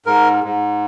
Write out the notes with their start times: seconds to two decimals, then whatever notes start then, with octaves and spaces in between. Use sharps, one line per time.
0.06 G#2 A#4
0.44 G#2